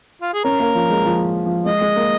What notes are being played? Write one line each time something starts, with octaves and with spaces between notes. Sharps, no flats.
F4
G#4
C#4 A#4
A#3
F3
G#3
F3
F3
G#3 D#5
G#3
A#3